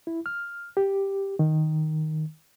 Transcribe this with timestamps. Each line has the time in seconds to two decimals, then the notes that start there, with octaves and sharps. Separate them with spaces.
0.07 E4
0.26 F6
0.77 G4
1.39 D#3